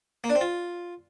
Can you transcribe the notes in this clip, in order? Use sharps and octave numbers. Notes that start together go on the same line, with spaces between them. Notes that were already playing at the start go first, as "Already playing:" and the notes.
A#3
D4
C4
F4